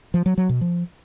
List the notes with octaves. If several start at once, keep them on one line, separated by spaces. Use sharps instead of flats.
F3
F#3
F#3
B2
F3